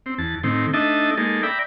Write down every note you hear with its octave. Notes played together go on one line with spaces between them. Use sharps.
C4
E2 A5
A2 D#3 C4
A3 D4 D#4 D#5 E5 A5
G#3 A#3 D#4 A4
D5 E5 G5 A#5 B5